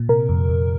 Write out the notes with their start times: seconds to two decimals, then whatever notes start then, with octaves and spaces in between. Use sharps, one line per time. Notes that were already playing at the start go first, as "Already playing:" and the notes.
Already playing: A#2
0.09 C3 A#4
0.29 F2
0.49 F2